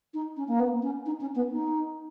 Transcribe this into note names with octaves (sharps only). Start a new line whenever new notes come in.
D#4
C#4
A#3
B3
C#4
D#4
C#4
B3
D#4